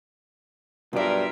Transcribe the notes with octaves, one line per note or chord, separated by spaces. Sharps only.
B1 G2 F4 A#4 D5 E5